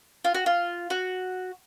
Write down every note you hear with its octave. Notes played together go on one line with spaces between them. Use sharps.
F4
F#4
F4
F#4